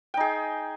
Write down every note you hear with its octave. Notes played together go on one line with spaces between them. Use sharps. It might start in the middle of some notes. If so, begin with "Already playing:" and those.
D#4 G#4 G5